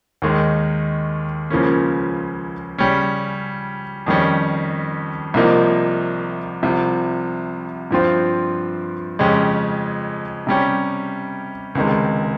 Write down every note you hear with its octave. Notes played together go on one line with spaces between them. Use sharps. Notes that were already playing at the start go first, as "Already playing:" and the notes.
D#2 D#3 G#3 D#4
C#2 C#3 F3 A#3 C#4
C#3 G3 C#4
F2 D#3 G3 C#4 G4
C2 C3 F3 A#3 D#4
C2 C3 F3
G2 F3 C4 F4
F2 C#3 G#3 C#4 G4
C3 G3 C#4 G4
C#2 C3 D#3 G#3